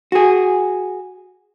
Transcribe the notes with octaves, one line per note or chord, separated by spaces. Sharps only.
F#4 G#4